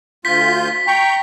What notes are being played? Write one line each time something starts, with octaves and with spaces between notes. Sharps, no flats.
D2 F4 G6 B6
G5 A#5 C#6 G6